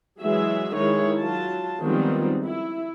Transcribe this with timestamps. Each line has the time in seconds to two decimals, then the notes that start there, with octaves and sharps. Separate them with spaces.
0.21 E3 F#3 G#3 G#4 E5
0.75 D#3 G#3 E4 G#4 C#5
1.18 F#3 F4 A5
1.82 D#3 F3 G3 G#3 B3 C4
2.46 E4